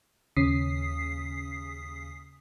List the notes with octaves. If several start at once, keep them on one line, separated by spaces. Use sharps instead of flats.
D#2 C#3 C#4 D#6 B6 C7